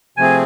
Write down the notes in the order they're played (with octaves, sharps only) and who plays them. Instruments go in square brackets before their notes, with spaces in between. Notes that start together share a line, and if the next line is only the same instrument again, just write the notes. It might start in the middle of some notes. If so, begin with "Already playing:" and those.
[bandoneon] C3 F3 A3 C4 G#4 [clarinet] G#5